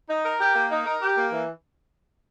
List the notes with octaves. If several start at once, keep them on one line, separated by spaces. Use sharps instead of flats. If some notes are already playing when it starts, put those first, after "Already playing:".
D#4
A#4
G4
A#3
D#4
A#4
G4
A#3
E3